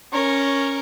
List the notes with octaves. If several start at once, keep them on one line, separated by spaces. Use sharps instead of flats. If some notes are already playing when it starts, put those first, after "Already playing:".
C#4 A#4